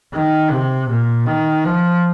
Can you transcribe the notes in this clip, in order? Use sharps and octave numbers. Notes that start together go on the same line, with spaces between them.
D#3
C3
A#2
D#3
F3